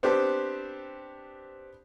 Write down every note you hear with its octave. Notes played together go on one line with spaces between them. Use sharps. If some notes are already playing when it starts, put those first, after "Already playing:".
B3 C4 D4 G4 C5